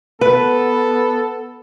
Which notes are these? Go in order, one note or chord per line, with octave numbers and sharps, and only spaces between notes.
B3 A4 B4